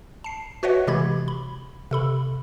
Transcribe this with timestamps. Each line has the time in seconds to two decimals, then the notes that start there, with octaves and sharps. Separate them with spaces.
0.24 A5 C7
0.63 F#4 B4 C#5 D#5 E5 F#5
0.87 C3 E3 G#3 G4 B5 G#6
1.28 B5
1.91 C3 A4 B5